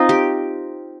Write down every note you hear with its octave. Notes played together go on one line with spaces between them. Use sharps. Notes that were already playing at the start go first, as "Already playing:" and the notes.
Already playing: C4 D#4 F4
G4